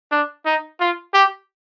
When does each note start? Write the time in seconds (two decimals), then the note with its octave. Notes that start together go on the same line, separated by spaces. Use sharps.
0.11 D4
0.46 D#4
0.80 F4
1.14 G4